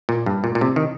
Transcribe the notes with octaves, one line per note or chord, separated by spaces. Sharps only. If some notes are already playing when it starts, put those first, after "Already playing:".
A#2
G2
A#2
A#2
C3
D#3